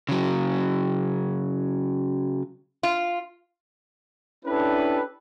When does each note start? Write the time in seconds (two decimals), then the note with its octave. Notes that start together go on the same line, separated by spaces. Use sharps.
0.09 C#3 F#3
2.83 F4
4.45 C#4 D4 E4 G4 A4 B4